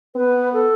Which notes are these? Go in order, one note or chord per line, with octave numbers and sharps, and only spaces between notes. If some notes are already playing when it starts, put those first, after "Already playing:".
B3 B4
A4